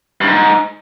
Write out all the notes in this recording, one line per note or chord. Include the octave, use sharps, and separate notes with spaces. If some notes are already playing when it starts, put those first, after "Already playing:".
G2
G#2